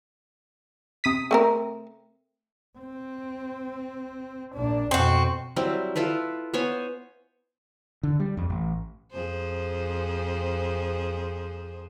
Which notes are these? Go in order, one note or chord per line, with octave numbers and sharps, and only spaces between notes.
C3 D#6 B6
A3 C4 A#4
C4
A#1 D4
F2 B2 C4 F#4
F#3 G3 C4 E4
E4 F4 A4 B4
B3 C5 C#5 G#5
D3
G3
F2
A1
F2 G#4 C5